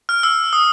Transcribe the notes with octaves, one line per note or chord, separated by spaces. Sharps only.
F6
E6
D#6